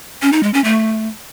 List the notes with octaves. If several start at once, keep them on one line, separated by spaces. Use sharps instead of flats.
C#4
D#4
G#3
C#4
A3